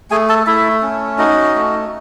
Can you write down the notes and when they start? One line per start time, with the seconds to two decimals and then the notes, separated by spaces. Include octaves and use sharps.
0.11 A3 G#4 G#5
0.29 A4 A5
0.46 A3 E4 E5
0.83 C#4
1.18 D#4 F#4 D#5
1.55 A3